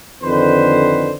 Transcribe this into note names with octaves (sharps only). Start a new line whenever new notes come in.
F2 D3 D#3 B4 C5